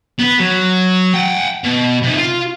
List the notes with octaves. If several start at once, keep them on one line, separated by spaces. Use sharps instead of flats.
B3 B4
F#3
F#5 G5
B2
C3 D#4
F4